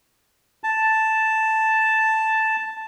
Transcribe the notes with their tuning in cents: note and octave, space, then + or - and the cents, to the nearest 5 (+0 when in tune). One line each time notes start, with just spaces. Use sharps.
A5 +0